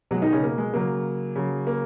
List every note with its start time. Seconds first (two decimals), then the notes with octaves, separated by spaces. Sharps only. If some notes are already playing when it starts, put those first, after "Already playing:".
0.11 B2 F#3 G#3 F#4
0.22 D#3 D#4
0.32 C#3 C#4
0.43 A#3
0.58 G#3
0.73 C#3 F#3 A#3
1.36 C#3 F#3
1.67 A#3